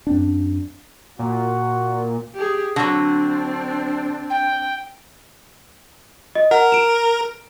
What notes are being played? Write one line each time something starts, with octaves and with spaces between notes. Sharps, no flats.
F#2 C4 D4
A#2 F#4
G4 G#4
D3 F#3 C4 D4
G5
D#5
A#4 F#5
D7 E7